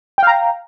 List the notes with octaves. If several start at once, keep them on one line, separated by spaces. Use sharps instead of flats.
F5 G5 A#5